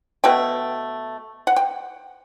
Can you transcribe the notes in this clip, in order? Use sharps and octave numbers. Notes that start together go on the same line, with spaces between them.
B2 A3 G5
F#5
G5